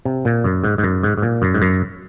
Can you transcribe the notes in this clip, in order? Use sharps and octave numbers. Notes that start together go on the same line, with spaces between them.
C3
A#2
F#2
G#2
G#2
F#2
G#2
G#2
A#2
F#2
G#2
F#2